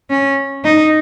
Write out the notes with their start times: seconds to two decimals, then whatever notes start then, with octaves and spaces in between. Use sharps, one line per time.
0.10 C#4
0.65 D#4